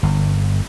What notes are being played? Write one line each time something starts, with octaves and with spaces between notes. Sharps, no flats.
G1